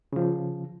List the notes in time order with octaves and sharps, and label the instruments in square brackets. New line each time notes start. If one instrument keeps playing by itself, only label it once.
[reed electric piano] C#3 F3